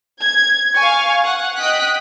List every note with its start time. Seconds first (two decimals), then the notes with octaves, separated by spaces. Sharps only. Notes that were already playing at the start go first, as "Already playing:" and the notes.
0.22 G#6
0.75 F5 G#5 C#6
1.24 F#5
1.58 D#5 G5 D#6 F#6 B6